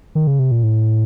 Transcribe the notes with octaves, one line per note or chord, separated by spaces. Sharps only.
D#3
C#3
C3
A#2
A2